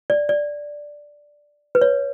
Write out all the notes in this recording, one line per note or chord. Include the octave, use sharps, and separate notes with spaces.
D5
D5
B4
C#5